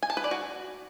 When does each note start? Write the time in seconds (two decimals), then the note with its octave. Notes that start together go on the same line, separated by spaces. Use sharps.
0.03 G#5
0.10 A5
0.17 B4
0.24 D5
0.31 F#4